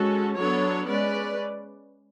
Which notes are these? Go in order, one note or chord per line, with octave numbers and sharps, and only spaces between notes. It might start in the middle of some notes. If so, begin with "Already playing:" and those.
Already playing: G#3 C#4 F#4 A4
F#3 B3 D4 A4 C#5
G#3 C#4 B4 D5